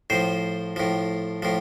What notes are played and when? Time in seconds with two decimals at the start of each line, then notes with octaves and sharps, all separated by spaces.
0.10 A2 F3 C5
0.76 A2 F3
1.42 A2 F3